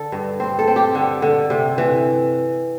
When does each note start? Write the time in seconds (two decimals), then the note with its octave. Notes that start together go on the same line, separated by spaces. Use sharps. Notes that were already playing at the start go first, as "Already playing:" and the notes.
Already playing: D3 A4
0.12 G2
0.40 C4 C5
0.59 A4
0.68 C4
0.76 G4
0.95 D3
1.22 D3
1.50 C3
1.78 E3